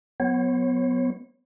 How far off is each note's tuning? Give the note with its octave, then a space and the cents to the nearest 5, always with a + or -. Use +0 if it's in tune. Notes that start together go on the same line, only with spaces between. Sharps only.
F#3 -20 B3 +10 C#5 -35